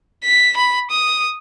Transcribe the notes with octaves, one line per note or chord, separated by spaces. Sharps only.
B6
B5
D#6